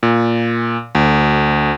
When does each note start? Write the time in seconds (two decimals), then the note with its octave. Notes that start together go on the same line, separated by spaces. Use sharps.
0.03 A#2
0.95 D2